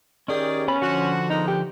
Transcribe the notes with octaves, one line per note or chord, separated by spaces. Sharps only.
D#3 C#4 G4 G#4 D5
B3 C#4 B5
D3 F3 F#4 C5
G#3 A#3 B3 D#4
G4